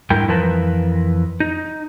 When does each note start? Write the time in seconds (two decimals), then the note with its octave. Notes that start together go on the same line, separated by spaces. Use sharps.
0.10 G#2 D3 G3 E4 A#4 G5
0.28 F2 E3 F3 A#4 B4 A5
1.40 D#4